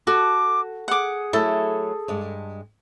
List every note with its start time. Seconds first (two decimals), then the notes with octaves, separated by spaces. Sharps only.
0.07 F#4 A4 D6
0.88 G#4 F#5 D6
1.33 F#3 A3 E4 A4
2.08 G2 G#3